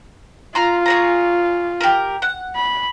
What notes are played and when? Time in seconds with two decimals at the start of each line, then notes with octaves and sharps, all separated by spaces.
0.55 F4 A#5 C6
0.86 G#4 C#5 A#5
1.81 G4 A#4
2.22 F#5
2.55 B5